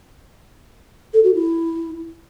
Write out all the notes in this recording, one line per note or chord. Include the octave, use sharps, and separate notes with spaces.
A4
F#4
E4